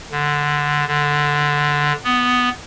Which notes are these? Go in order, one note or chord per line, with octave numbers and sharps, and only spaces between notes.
D3
D3
B3